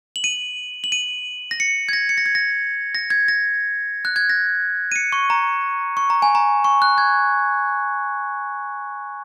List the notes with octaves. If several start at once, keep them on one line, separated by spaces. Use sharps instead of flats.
F#7
D#7
F#7
D#7
A#6
C#7
G#6
A#6
C#7
A#6
G#6
A#6
A#6
G#6
A#6
F#6
G#6
A#6
D#7
C#7
C#6
A#5
C#6
A#5
G#5
A#5
C#6
F#6
G#6